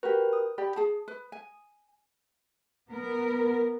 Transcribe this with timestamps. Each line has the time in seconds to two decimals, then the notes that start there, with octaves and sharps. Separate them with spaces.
0.03 F#4 G4 A#4 B4
0.33 D#6
0.58 G4 D5 B5
0.76 G#4 A5
1.08 B4
1.32 G#5
2.89 B3 A#4